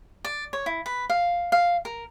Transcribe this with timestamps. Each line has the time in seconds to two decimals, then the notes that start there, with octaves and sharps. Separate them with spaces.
0.25 D5
0.53 C#5
0.66 E4
0.86 B4
1.10 F5
1.52 F5
1.85 A#4